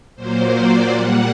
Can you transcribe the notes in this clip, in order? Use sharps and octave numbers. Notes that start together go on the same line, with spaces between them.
A#2 F#3 A#3 C5
D5
A#2 G3 A#3 F#5